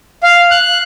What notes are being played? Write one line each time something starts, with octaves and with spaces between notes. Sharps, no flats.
F5
F#6